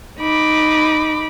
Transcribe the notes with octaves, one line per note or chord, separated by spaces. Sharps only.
D#4 B5 D6